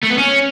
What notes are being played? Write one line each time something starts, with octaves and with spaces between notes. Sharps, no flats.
A3
B3
C#4